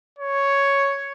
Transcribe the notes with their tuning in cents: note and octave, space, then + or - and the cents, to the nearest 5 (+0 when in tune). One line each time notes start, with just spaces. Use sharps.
C#5 +5